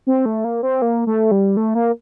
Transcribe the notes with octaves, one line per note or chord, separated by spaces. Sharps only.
C4
A3
A#3
C4
A#3
A3
G3
A3
A#3